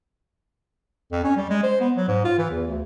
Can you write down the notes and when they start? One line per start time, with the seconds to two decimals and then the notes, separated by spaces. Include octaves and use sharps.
1.12 F2
1.24 C#4
1.36 G3
1.49 G#3
1.63 C5
1.80 B3
1.96 F#3
2.08 G#2
2.24 F4
2.38 E3
2.50 E2
2.67 D2